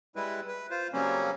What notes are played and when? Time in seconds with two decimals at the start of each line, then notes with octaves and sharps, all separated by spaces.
0.16 G3 G#3 E4 B4
0.48 B4
0.70 F4 C5
0.93 C#3 F#3 G3 A#3 C4 C#4